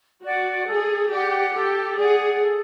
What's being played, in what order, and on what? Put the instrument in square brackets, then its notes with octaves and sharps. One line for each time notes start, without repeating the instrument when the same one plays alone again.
[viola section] F#4 [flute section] D5 F#5
[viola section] G#4 [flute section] A4
[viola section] G4 [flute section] D5 F#5
[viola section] G4 [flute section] A4
[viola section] G#4 [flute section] D5 F#5
[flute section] A4